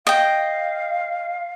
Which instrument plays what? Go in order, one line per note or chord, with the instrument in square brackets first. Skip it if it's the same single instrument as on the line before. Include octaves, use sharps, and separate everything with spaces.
[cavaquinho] D#5 G5 [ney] F5